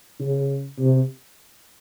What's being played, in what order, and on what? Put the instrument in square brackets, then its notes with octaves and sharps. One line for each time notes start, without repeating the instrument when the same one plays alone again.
[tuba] C#3
C3